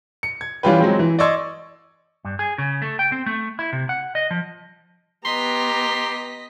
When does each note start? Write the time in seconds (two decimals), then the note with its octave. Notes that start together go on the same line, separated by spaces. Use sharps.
0.23 C#7
0.41 G#6
0.63 E3 G3 C#4 F4 G4 B4
0.80 F#3 G#3 C4
0.99 E3
1.19 D5 D#5 C6 C#6 E6 G#6
2.25 G2
2.39 G#4
2.58 C#3
2.82 A3
2.99 G5
3.12 C4
3.26 A3
3.59 E4
3.73 C3
3.89 F#5
4.15 D#5
4.31 F3
5.25 B3 G4 D#5 A#5 C6 B6